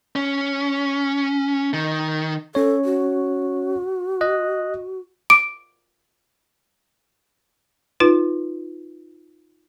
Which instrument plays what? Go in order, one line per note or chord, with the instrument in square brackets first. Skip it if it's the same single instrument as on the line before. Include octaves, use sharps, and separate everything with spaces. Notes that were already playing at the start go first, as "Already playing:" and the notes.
[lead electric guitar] C#4
D#3
[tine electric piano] C#4 C#5 [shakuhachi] A4
[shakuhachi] F#4
[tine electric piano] D#5 F#6
[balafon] D6 [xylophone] D7
[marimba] D#4 F4 B4